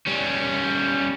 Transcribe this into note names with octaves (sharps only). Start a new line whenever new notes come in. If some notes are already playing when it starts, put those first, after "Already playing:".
G3 C#4